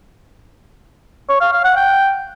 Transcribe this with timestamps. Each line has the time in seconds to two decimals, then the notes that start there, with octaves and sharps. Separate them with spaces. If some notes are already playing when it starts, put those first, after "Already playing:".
1.29 C#5
1.41 F5
1.53 F5
1.64 F#5
1.76 G5